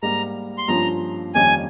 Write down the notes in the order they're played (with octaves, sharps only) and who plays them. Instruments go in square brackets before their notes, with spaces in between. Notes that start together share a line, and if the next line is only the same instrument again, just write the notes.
[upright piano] G#2 G3 A#3 [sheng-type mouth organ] A#5
[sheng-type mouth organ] C6
[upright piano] G2 F3 A#3 C#4 [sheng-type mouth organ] A#5
[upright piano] F2 D#3 G3 A#3 C#4 [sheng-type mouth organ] G#5